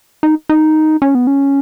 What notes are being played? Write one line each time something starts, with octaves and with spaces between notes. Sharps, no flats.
D#4
D#4
C#4
B3
C#4